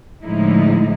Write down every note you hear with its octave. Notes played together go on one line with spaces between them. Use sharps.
A2 D3 F3 G#3 D#4 E4